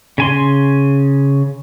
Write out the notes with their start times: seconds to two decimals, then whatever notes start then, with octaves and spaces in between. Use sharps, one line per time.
0.18 C#3 G#5 C6